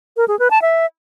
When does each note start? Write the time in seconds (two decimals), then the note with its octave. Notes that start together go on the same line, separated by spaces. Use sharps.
0.17 A#4
0.28 G#4
0.39 B4
0.50 A5
0.62 E5